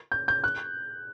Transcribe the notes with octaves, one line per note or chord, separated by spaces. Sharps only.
G6
G6
F#6